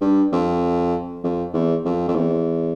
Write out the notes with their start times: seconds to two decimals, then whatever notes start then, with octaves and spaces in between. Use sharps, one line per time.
0.01 G2
0.32 F2
1.24 F2
1.53 E2
1.85 F2
2.08 F2
2.15 E2